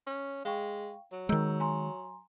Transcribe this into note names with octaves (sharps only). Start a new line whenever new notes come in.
C#4
G#3 F5 G5 C#6
F#3
D#3 G#3 A#5 E6 G6
G#5 A#5 C6